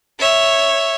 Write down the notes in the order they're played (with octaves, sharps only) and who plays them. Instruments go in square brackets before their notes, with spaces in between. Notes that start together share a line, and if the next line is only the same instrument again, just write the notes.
[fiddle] C#5 E5